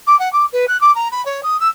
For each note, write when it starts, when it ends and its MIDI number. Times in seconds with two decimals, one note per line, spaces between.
0.07 0.18 86
0.19 0.31 78
0.32 0.45 86
0.52 0.65 71
0.68 0.79 90
0.81 0.93 86
0.95 1.08 82
1.11 1.24 83
1.25 1.40 73
1.43 1.59 87
1.60 1.68 88